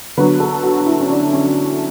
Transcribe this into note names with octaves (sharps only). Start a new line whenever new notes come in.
D3 F#3 B3 B4
A4
F#4
F#4
E4
C#4
D4
C#4